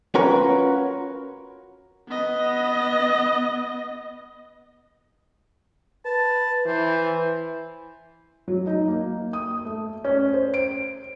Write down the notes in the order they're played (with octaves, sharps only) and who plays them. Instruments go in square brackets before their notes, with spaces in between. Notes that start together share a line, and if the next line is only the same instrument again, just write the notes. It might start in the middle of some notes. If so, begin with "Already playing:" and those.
[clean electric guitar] C#4 F4 F#4 A#4 B4 C#5
[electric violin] B3 D#5
[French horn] B4 [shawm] A5
[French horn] E3 [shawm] C5
[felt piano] F#3
D#4
A#3
D#6
A3
C#4
C5
D7